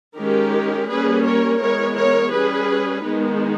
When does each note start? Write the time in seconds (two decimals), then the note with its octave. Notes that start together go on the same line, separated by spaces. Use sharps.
0.16 D#3 G#3 C#4 G4 A#4
0.88 G3 A#3 C#4 G#4 B4
1.24 A#4 C#5
1.60 E3 G#3 B3 A#4 C#5
1.96 A#4 C#5
2.31 G3 C#4 G#4 B4
3.03 D#3 G#3 B3 D#4